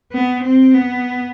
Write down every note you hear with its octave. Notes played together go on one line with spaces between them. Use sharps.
B3
C4
B3